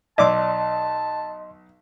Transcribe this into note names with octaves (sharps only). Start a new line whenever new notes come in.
B1 D5 D#5 A5 C6 D6 E6